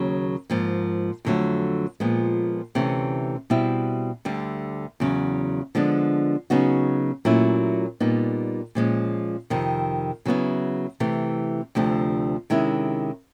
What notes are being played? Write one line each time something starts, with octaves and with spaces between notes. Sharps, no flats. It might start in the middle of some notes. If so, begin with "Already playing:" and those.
Already playing: D#2 C#3 F#3
G#2 F3 A#3
F2 D3 F#3 A3
A#2 F3 G#3 B3
D2 C3 E3 A3 C#4
B2 G3 C4 E4
D2 D3 G3
E2 C#3 F#3
D3 F3 G#3 B3 D4
C#3 F#3 B3 D#4 F#4
A#2 F#3 A3 C#4 E4
A#2 G3 B3 D#4
A#2 F3 G#3 C#4
F2 C3 D#3
C#3 F#3 B3 E4
C3 E3 A3
D2 C3 F3 A3 D4
C3 D#3 G#3 C#4 E4